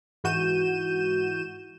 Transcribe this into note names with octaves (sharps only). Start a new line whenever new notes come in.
G#2 E3 F#4 G6 D#7 E7